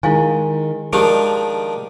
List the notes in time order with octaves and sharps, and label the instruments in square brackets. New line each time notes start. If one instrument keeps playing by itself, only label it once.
[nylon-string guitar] D#3 G#3 [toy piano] E4 F5 G#5
[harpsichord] D#3 F3 D4 [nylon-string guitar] G#3 [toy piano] G4 D6